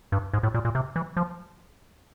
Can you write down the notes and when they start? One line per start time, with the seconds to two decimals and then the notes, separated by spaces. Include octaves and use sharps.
0.12 G2
0.33 G#2
0.43 A2
0.54 A#2
0.65 A#2
0.75 C3
0.96 E3
1.17 F3